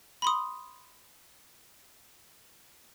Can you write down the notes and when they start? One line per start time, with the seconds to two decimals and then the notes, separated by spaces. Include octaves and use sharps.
0.22 B5 C6 D#6